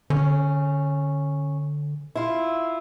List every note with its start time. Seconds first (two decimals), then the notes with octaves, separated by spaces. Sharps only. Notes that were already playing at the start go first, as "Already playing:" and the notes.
0.10 D3 C#4
2.15 E4 F4